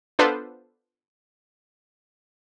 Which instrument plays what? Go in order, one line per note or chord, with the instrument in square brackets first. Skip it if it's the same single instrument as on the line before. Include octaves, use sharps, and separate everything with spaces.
[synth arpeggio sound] B3 D4 F4 A4 B4 C5